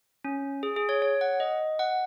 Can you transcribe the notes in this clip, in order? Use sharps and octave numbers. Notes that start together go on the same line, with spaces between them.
C#4
G#4
G#4
C#5
C#5
F#5
D#5
F#5